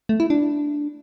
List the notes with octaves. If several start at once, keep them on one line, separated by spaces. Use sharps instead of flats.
A3
E4
D4